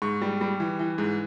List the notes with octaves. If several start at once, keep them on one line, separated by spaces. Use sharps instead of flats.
G#2 C#6
G3
G3
E3
E3
G#2